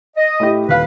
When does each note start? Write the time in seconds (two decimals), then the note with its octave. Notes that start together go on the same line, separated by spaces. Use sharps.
0.17 D#5
0.40 A2 E4 G4
0.69 D#1 B4 F5